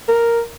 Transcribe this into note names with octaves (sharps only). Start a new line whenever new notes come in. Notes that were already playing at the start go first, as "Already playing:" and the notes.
A#4